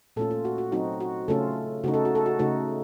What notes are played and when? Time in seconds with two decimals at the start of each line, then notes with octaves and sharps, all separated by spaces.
0.16 A#2 A3 C#4 F4 A4
0.31 F4
0.45 F#4
0.58 F#4
0.72 F#3 C4 D#4 F#4
1.00 F#4
1.28 C#3 A3 C#4 F4 A4
1.84 C#3 A3 D#4 F#4
1.94 A4
2.05 F#4
2.15 A4
2.26 F#4
2.39 C#3 A3 D#4 F#4